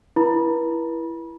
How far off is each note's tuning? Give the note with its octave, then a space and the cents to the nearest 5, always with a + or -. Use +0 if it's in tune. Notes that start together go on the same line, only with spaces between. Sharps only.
E4 +15 B4 -45 B5 -30